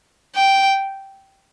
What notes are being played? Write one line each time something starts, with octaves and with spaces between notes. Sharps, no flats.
G5